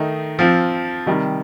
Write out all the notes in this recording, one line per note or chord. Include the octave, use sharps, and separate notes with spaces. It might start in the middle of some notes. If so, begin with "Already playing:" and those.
Already playing: D#3 A3 D#4
F3 C4 F4
C3 D#3 G3